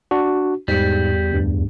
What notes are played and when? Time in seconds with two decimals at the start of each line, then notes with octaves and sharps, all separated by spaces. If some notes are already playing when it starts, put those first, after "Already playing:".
0.11 D4 F#4
0.68 E2 G#2 G3
1.32 D2 G2